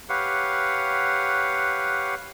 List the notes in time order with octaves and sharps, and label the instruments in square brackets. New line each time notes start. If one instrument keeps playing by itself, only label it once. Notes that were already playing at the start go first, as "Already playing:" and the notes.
[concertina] G4 B4 C#5 F5 F#5